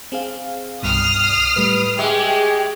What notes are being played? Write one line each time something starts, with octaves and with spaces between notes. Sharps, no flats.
C4 G#4 F5
C2 G2 B2 D#6 F6 C7
A2 G3 A3 B4
G#3 G4 G#4 E5 G5 C#6